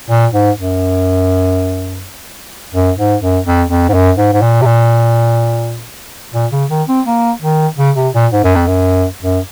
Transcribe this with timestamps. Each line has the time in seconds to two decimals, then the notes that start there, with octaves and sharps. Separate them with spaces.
0.10 A#2
0.33 G#2
0.58 F#2
2.74 F#2
2.98 G#2
3.22 F#2
3.46 F2
3.69 F2
3.89 G#2
3.94 F#2
4.18 G#2
4.33 G#2
4.42 A#2
4.62 C3
4.66 A#2
6.34 A#2
6.52 C#3
6.70 D#3
6.88 C4
7.06 A#3
7.42 D#3
7.78 C#3
7.96 C3
8.14 A#2
8.32 G#2
8.44 F#2
8.55 F2
8.67 F#2
9.22 F#2